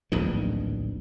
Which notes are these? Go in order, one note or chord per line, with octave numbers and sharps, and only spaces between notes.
D1 A#1 E2 D#3